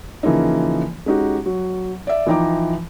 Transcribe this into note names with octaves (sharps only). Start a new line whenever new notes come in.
C#3 E3 F3 A#3 D#4
G#3 C#4 D#4 F#4 G4
F#3
D5 E5
E3 F3 D#4 G5 A#5 D6